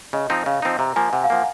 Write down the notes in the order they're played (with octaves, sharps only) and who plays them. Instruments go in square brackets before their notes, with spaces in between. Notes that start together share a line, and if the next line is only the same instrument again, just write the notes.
[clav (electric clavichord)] C#3 [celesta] D#5
[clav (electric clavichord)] F3 C4 D#4
[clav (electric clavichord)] C#3 [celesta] F5
[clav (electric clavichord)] F3 C4 D#4
[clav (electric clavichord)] C3 [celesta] A#5
[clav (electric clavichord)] F3 A#3 [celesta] G#5
[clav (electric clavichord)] C3 [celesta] F#5
[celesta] F5
[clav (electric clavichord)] F3 A#3 [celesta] F#5